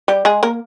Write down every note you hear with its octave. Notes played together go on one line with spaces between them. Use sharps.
G3 G4
G#3 G#4
A#3 A#4